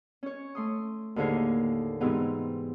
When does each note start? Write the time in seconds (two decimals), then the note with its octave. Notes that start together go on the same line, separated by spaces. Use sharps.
0.23 C#4 C#5
0.55 A3 C6 D#6
1.16 D#2 A2 D3 A#3 G#4 C5
2.01 G#2 C3 E3 B3